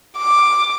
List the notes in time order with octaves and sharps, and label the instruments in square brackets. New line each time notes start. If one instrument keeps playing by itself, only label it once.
[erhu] D6